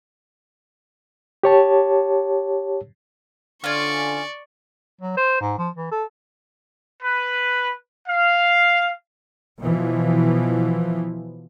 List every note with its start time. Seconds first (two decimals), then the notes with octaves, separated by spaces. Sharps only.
1.43 G4 C#5 A5
3.64 D3 C#4 F4 D5 C#6
5.01 F#3
5.17 C5
5.41 G#2
5.58 F3
5.76 E3
5.91 A4
7.03 B4
8.08 F5
9.60 B2 E3 F3